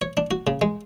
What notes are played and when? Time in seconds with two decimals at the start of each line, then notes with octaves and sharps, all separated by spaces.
0.02 C#5
0.17 D4
0.31 F#4
0.47 C#3
0.61 G#3